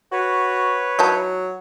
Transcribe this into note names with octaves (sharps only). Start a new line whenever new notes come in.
F#4 B4 C#5
E3 F#3 D#4 A5